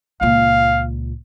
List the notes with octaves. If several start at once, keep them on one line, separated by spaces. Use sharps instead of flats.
C#2 A#2 F5